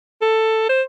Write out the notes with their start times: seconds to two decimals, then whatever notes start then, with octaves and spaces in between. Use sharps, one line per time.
0.22 A4
0.69 C5